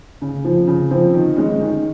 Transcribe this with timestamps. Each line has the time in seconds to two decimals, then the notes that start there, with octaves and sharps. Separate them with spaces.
0.22 C#3
0.45 F3 C4
0.67 C#3
0.90 F3 C4
1.14 D#3
1.36 G#3 C#4
1.60 D#3